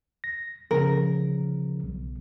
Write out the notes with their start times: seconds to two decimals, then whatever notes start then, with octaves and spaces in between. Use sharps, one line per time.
0.24 A#6
0.71 C#3 F3 A#4
1.83 B1